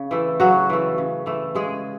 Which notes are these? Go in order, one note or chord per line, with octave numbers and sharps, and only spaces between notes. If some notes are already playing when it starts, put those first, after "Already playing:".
Already playing: C#3
E3 A3
C#3 F#3 F#4
E3 A3
C#3
E3 A3
C#3 G#3 G#4